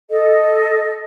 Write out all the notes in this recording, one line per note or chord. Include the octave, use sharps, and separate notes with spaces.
A4 D#5